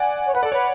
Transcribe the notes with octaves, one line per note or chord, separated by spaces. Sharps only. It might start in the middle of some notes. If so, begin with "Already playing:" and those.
Already playing: D5 F#5 G#5
C#5
B4 F#5
A4 D5
B4 C#5